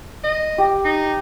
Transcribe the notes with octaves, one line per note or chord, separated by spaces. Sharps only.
D#5
G4
D#4